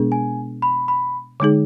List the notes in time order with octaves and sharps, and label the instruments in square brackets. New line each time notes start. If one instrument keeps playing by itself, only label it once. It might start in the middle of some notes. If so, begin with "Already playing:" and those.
Already playing: [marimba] B2 G#3 B3 D4 G#4
[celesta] G#5
B5
B5
[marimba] D3 G#3 D#4 G#4